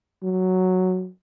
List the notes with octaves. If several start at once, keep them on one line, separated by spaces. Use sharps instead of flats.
F#3